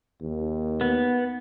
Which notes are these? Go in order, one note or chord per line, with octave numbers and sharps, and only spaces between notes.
D#2
B3